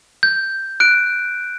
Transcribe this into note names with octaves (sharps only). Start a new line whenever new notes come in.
G6
F#6 D7